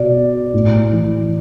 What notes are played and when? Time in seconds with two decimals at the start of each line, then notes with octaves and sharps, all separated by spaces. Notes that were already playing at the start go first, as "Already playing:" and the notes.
Already playing: B2 D5
0.54 A2
0.93 E3